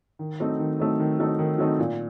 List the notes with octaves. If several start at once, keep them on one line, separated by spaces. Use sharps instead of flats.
D#3
F#3 A3 C4 D#4
D#3
F#3 A3 C4 D#4
D#3
F#3 A3 C4 D#4
D#3
F#3 A3 C4 D#4
A#2